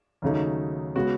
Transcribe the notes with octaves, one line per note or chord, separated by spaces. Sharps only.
D#2 C#3 F#3 A3 D#4
C#3 G#3 B3 F#4